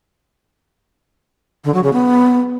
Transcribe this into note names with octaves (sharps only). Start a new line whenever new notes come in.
D3
F#3
C#3
B3